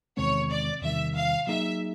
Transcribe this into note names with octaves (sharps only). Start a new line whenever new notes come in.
E2 C3 D#3 G#3 C4 C#5
D5
E2 C3 D#3 G3 E5
F5
F#3 A#3 D#4 G#4 E5